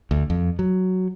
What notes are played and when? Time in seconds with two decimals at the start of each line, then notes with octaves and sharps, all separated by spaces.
0.11 D2
0.30 F2
0.59 F#3